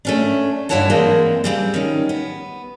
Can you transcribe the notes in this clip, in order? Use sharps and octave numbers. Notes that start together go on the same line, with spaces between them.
A3 C#4 D4
G2 D3 E4 C#5 F#5 A5
E3 G#3 A#3 C4 D4
C#3 G3 C4
D#3 C#4
B3